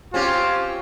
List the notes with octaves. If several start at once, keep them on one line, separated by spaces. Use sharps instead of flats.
C4 C#4 F4 G4